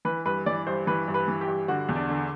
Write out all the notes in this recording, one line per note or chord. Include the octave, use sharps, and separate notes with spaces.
E3 B4
G2 B4
E3 D5
G2 C5
E3 B4
G2
B4
E3
G4
G2
D3 F#4
E2
D4
D3